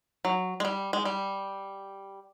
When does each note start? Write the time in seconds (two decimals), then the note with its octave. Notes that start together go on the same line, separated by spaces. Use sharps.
0.25 F#3
0.60 G#3
0.65 G3
0.93 G#3
1.05 G3